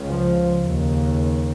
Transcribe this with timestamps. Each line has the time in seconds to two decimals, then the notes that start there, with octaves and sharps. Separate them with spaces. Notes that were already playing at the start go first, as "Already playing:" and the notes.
Already playing: C#2 C#3
0.10 F3
0.66 D#2 C#3